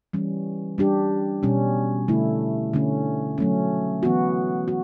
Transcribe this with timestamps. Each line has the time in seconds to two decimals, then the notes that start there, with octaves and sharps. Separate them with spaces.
0.13 E3 G3 C#4
0.78 G3 D4 G4
1.43 B2 G3 C#4
2.08 D3 A3 E4
2.73 D3 A3 C#4
3.38 F#3 A3 C#4
4.03 E3 B3 F#4
4.68 F#4